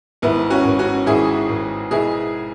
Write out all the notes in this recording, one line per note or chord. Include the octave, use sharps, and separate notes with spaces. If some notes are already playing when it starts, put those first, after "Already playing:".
G#1 B3 E4
C#4 F#4
G#1
C#4 F#4
G#1 E4 G#4
G#1
B2 E4 G#4